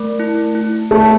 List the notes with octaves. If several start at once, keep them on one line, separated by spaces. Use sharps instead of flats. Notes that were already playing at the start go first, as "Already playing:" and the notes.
Already playing: A3 A#4
E4
E4
A3 C#5